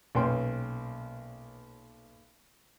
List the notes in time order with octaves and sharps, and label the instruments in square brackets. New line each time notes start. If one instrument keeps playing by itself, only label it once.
[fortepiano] B1 A#2 C#4 B4 G5 C6